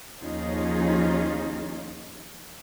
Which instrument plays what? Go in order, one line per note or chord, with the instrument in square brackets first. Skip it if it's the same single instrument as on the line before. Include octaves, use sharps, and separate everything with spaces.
[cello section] D#2 F3 C#4 D#4 F4 G#4